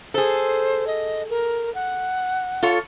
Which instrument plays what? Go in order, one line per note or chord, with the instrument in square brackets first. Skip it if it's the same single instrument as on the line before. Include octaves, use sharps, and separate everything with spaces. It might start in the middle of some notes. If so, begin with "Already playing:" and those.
[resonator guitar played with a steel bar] G#4 A4 [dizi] C5
[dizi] D#5
A#4
F#5
[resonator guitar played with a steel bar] F4 A4 C#5